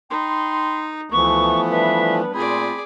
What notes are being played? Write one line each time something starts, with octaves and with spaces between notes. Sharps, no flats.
D#4 G5 B5 C6
D2 E3 F3 A3 B3 C#6
G3 D4 B4 E5
A#2 A3 C4 F4 G#4 D5 B5